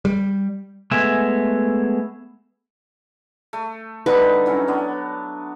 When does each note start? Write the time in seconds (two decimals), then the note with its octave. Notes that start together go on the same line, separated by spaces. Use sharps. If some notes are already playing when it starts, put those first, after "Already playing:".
0.05 G3
0.91 G#3 A3 B3 E5 G#5
3.53 A3
4.06 D3 G3 D#4 B4
4.46 E3 F#3 C#4
4.68 B3 D4